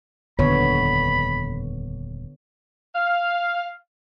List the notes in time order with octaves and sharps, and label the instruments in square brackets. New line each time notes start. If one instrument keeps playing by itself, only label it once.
[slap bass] D#1 F2 [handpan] D3 B3 C#5 [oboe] B5
[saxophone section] F5